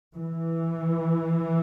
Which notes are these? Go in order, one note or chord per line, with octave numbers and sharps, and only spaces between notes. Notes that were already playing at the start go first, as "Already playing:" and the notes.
E3